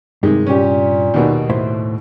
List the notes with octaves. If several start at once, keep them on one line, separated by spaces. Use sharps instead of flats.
G2 C3 D#3 G#3
A#2 C#4 G4
D#2 B2 D#3
A2 E4 C5